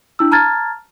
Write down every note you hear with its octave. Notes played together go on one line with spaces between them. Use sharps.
D4 E4 E6
A5 A#5 F6 G#6 A6